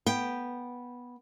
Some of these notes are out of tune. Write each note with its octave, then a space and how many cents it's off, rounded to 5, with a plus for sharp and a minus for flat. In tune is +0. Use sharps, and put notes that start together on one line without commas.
B3 -10 G5 +0